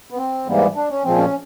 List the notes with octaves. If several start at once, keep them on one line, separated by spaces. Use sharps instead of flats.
B3
C4
G#2 E3 G3 A#3 B3
B3
D4
C#4
A#2 F3 G#3 C4
C#4